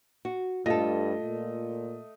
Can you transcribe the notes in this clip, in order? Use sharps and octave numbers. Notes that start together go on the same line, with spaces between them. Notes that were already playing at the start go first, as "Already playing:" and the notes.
F#4
G2 A3 F4 A4 D#5 A#6
A#2